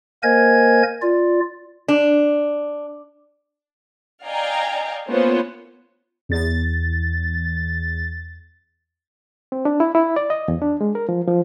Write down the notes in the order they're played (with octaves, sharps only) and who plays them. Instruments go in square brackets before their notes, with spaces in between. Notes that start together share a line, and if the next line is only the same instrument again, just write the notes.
[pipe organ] A#3 A#4 C5 D#5 G#5 G#6
F4 D5
[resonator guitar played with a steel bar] D4
[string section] D5 D#5 F5 G5 G#5 A#5
A#3 B3 C#4 F4 C5 C#5
[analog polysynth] E2 A6
[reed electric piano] C4
D4
E4
E4
D5
D#5
E2
D4
G#3
A#4
F3
F3